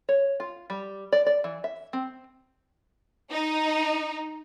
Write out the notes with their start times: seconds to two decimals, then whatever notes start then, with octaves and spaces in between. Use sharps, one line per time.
0.09 C#5
0.40 F4
0.70 G3
1.12 D5
1.26 D5
1.44 E3
1.64 E5
1.93 C4
3.30 D#4